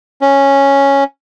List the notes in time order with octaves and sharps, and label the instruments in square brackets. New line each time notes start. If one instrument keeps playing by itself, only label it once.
[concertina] C#4